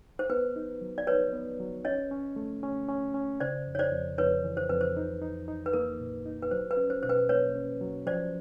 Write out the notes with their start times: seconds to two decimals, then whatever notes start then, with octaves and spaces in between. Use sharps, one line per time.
0.19 C5
0.30 B3 B4
0.56 D#4
0.81 F#3
0.98 D5
1.07 D#4 B4 C#5
1.33 B3
1.60 F#3
1.85 C#4 C#5 D#5
2.11 C#4
2.36 A3
2.63 C#4
2.89 C#4
3.14 C#4
3.40 C#3 C5 D5
3.67 F2
3.75 C#5
3.79 C5 D5
3.92 F2
4.18 F2 B4 C#5
4.44 E3
4.57 C5
4.69 F2 B4
4.81 C5
4.97 D#4
5.22 D#4
5.48 D#4
5.66 B4
5.73 A#3 A#4
6.00 A#2
6.26 D#4
6.42 B4
6.51 F#3 C5
6.71 B4
6.77 C#4
6.90 C5
7.03 B2 C5
7.10 B4
7.29 A#3 B4 C#5
7.55 C#4
7.81 F#3
8.06 F3 C5 D5